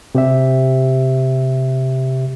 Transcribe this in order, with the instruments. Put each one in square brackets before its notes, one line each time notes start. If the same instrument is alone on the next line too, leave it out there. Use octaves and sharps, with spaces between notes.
[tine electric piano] C3 G4 E5